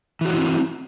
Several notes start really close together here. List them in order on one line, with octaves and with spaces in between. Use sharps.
E3 F#4 F#3 E4 C4